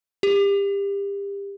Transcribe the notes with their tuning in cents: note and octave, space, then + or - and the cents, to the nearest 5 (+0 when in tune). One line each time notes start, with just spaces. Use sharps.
G4 +30